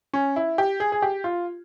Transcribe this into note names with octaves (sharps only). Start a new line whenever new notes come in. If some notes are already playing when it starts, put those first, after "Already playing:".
C#4
E4
G4
G#4
G#4
G4
F4